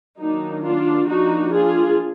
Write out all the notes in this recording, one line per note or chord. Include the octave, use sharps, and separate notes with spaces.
D#3 F#3 A#3 D4 D#4
D4 F4
F3 A#3 D4 D#4 F#4
F4 G#4